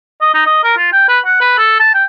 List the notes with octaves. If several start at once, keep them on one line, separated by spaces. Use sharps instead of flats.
D#5
D#4
D#5
A#4
F4
G5
B4
F#5
B4
A4
A5
G5